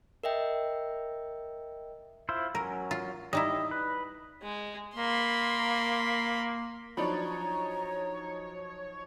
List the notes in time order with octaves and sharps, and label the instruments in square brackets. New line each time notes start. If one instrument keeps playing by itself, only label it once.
[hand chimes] A#4 D#5 E5 G5
[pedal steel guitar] E4 F4 C5
[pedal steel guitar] F#3 C#4 [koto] A#4
[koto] F4
[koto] G3 D#4 E4 [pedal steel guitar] D#5
[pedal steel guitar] B4
[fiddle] G#3
[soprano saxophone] A#3 [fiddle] B5 C6
[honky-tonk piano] F3 F#3 D#4 [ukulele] D4 D5 B5 [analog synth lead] C#5 [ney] A#5